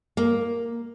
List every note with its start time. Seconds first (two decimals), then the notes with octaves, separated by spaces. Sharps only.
0.17 A#3